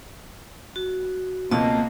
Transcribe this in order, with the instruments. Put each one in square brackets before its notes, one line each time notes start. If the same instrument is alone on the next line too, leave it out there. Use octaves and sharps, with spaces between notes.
[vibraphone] F#4
[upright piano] C#2 B2 [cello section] A#3 C4 [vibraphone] D#5 A5